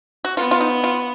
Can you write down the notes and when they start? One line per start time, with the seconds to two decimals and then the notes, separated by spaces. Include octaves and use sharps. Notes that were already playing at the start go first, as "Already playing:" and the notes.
0.25 F#4
0.37 B3 F4
0.51 F4
0.61 D#4
0.84 F4